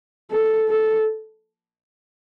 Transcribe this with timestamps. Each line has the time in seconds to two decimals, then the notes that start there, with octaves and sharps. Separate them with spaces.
0.31 A4
0.69 A4